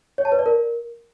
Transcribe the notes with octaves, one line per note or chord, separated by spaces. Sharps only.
C#5
A5
B4
D5
A#4